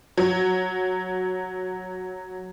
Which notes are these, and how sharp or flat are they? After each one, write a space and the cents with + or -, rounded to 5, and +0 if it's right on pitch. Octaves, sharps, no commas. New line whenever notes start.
F#3 +0